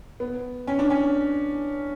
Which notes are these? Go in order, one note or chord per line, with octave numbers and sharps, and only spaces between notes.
B3
C#4
D4
C#4